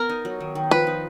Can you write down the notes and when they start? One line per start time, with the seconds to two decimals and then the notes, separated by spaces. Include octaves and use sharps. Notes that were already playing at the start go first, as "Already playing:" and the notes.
Already playing: B3 A#4
0.09 D#4
0.25 F#3
0.40 D#3
0.55 D#3
0.71 F3 B4
0.87 D#4